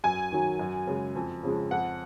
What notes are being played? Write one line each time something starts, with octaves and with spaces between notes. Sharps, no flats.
F#2 G#5
D#3 F#3
F#2
C#3 G#3
F2
C#3 F3 G#3
F2 F#5